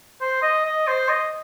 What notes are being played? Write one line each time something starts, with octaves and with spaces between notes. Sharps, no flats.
C5
D#5
D#5
C5
D#5